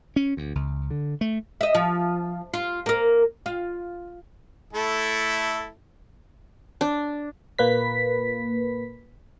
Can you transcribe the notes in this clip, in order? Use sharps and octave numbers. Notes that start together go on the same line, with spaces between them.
C#4
D2
C#2
D3
A3
D#5 E5
F3
F4
A#3 A#4
F4
A3 E4 A4
D4
A#2 A#3 B4 B6